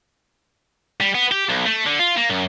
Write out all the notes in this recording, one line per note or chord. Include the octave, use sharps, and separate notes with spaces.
G3
B3
G4
B1
A3
D3
F4
A#3
F#2